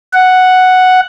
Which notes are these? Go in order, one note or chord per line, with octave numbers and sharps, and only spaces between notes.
F#5